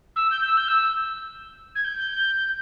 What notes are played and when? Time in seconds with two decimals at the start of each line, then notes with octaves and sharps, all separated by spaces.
0.16 E6
0.31 G6
0.46 E6
0.57 G6
0.68 E6
1.75 G#6
1.84 G6